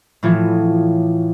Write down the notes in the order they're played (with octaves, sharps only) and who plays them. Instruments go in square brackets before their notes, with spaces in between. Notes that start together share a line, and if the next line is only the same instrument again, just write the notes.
[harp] A2 E3 F3